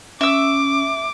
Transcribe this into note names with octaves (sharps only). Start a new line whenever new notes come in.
C#4 E5 D6 E6